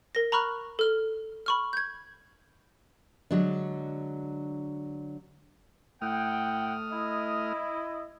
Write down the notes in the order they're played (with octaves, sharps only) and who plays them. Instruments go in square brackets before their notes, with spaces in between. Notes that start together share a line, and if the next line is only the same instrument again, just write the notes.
[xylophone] A#4 A#6
A#5 B5 C#6 F6 F#6
A4 F6 G7
B5 C#6 F6
G6 G#6
[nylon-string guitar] D3 F#3 G#3 D4
[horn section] A2 F#5 G5 [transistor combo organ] A3 D#6 F6
[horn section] E4 D#5